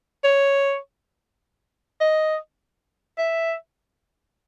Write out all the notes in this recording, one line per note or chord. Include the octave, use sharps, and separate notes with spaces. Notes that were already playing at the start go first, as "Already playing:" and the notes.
C#5
D#5
E5